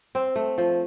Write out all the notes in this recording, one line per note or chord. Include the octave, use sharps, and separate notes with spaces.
C4
A3
F3